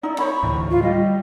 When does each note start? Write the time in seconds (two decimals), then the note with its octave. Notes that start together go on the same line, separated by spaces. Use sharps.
0.03 D#4 E4 D5
0.19 C5 C#5 B5 C#6
0.43 D2 A2 E3
0.71 F4
0.83 G3 D#5